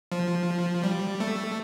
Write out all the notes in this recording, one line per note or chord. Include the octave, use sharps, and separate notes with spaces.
F3
G3
A3